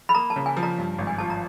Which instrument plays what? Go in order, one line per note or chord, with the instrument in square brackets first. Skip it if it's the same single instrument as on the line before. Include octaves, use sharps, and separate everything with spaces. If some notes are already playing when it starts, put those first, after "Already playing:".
[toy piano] B5
[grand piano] A#3 [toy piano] A#5
[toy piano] A5
[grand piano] C#3
[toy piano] G#5
[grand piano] F3
[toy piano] A#5
[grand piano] G2
G#1
[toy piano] G#5
[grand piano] F3 [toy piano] A5
[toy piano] A#5